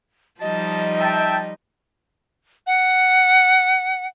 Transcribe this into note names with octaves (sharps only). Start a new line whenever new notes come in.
F3 G3 D#4 D#5 A5
E5 G5 A5
F#5